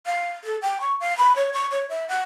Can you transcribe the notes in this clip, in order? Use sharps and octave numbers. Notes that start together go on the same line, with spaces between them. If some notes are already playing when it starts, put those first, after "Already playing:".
F5
A4
G5
C#6
F5
B5
C#5
C#6
C#5
E5
F#5